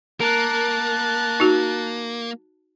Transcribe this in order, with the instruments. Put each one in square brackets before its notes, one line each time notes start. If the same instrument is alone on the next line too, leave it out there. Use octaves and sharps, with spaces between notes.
[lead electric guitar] A#3 [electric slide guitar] A#4 [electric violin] A5 F#6
[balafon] D#4 F#4